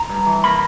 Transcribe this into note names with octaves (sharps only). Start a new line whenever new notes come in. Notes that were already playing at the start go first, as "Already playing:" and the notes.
Already playing: A#5
G2
E3
A#3 B5